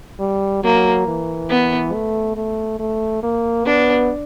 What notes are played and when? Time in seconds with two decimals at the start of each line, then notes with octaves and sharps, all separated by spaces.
0.20 G3
0.63 F#3 A#3
1.07 E3
1.49 B3
1.93 A3
2.36 A3
2.80 A3
3.23 A#3
3.65 B3 D4